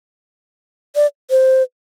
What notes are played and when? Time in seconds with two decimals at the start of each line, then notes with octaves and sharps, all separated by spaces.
0.96 D5
1.30 C5